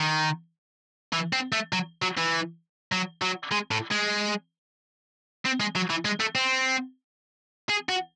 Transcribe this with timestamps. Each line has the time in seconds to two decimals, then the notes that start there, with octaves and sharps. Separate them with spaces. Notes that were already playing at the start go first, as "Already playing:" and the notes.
Already playing: D#3
1.13 E3
1.33 C4
1.52 A3
1.73 F#3
2.02 F#3
2.18 E3
2.92 F#3
3.22 F#3
3.52 G#3
3.71 A2
3.91 G#3
5.46 C4
5.60 G#3
5.75 F#3
5.90 E3
6.05 G#3
6.20 A3
6.35 C4
7.70 G#4
7.89 F#4